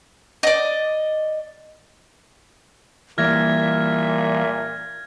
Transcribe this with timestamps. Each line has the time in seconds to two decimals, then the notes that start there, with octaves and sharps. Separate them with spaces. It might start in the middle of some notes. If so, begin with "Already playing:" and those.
0.43 D5 D#5
3.18 A#2 E3 G3 A#3 E5 F6 G#6 A#6